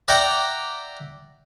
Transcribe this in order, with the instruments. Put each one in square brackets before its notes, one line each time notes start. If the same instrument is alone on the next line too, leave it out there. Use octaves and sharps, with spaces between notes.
[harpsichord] D5 E5 F#5 G5 A#5 D6